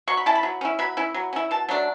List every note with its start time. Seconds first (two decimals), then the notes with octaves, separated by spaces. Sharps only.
0.08 F#3 C#6
0.17 B5
0.26 C#4 E4 A5
0.35 B5
0.43 F#3
0.61 C#4 E4
0.79 F#3 B5
0.97 C#4 E4
1.15 F#3
1.33 C#4 E4
1.51 B2 A5
1.69 F#3 A3 D4